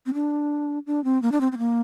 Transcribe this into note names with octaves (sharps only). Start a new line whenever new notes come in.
C4
D4
D4
C4
A#3
D4
C4
C4
A#3